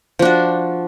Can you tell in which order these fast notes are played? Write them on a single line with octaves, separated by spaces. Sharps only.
F3 D4 F#4